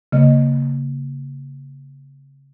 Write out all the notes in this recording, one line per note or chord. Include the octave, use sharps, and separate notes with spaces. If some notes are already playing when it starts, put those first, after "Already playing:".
C#3 A#3 D#5